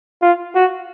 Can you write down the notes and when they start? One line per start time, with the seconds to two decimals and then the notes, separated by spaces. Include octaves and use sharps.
0.22 F4
0.55 F#4